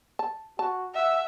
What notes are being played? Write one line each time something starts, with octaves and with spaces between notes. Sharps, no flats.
A5
F#4 A5
E5 F#5